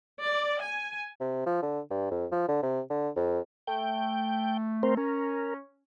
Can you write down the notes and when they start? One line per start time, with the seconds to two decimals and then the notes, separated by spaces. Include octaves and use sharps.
0.25 D5
0.62 G#5
1.20 C3
1.46 F3
1.62 D3
1.90 G2
2.11 F2
2.32 F3
2.48 D3
2.63 C3
2.90 D3
3.16 F2
3.67 A3 G5
4.83 C4 A#4 C5
4.97 C#4 A#4